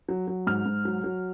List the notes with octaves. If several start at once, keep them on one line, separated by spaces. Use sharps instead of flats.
F#3
F#3
G#2 F6
G#2
F#3
F#3